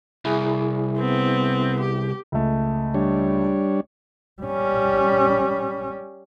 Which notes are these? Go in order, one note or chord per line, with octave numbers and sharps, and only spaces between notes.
C2 E4 G#4
B3 C4
G4
C#2 A3
G3 D4 C#5
G3 C#4